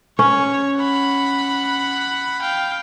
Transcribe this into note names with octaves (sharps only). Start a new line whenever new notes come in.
C#4 C#5
F#5 B5
F5 G5